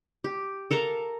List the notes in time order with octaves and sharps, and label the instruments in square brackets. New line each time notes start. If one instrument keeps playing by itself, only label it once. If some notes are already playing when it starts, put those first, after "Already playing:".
[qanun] G4
A4 A#4 F5 A#5